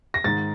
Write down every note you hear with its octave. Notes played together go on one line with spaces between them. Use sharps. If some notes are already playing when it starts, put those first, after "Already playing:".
A#6
G#2 D#3 A6